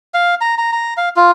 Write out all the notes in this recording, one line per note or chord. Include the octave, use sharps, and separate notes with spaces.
F5
A#5
A#5
A#5
F5
F4